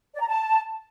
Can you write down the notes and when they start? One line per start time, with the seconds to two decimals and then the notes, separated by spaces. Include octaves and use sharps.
0.15 D5
0.21 A#5
0.27 A5